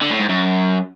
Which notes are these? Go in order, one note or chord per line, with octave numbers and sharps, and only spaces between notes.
D3
A2
G#2
F#2